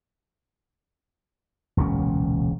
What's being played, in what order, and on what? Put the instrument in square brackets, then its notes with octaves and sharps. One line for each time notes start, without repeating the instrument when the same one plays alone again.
[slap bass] E1 C#2 A#2 C#4